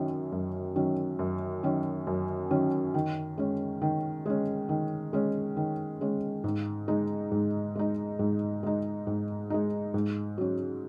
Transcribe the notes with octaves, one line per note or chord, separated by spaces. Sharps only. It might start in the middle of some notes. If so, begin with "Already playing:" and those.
Already playing: F#2 D#3 F#3 C#4
F#2
D#3 F#3 C#4
F#2
D#3 F#3 C#4
F#2
D#3 F#3 C#4
D#3
G#3 C#4
D#3
G#3 C#4
D#3
G#3 C#4
D#3
G#3 C#4
G#2
G#3 D#4
G#2
G#3 D#4
G#2
G#3 D#4
G#2
G#3 D#4
G#2
F#3 C#4